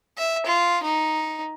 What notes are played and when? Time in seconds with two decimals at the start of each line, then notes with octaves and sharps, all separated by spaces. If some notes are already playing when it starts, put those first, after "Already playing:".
0.18 E5
0.46 F4
0.83 D#4